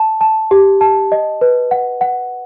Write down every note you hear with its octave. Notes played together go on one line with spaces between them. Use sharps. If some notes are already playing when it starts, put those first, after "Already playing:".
Already playing: A5
A5
G4
A5
D#5
B4
F#5
F#5